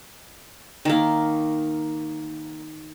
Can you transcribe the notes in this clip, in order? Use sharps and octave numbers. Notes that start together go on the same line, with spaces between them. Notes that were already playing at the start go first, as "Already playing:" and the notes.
D#3 A#3